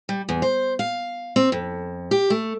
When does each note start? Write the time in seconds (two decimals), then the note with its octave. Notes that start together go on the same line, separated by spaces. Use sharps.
0.09 G3
0.29 E2
0.42 C5
0.79 F5
1.36 C4
1.52 F2
2.11 G4
2.30 A3